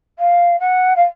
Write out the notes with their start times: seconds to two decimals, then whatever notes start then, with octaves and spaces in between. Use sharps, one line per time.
0.19 F5
0.60 F#5
0.96 F5